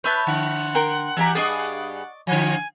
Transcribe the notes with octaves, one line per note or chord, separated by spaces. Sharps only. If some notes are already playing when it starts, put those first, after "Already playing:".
B4 C#5 E5 A5 G6
D3 F#5
A#4 G5 C6
E3 G4 E5 G#5 A#5
G2 G4 G#4 D5 D#5 C#6
D3 F3 G#5